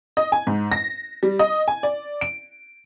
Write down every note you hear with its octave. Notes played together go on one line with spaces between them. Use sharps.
D#5
G#5
G#2
A#6
G3
D#5
G#5
D5
D7